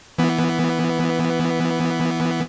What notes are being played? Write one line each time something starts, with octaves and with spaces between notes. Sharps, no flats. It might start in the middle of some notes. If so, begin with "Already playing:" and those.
E3 B3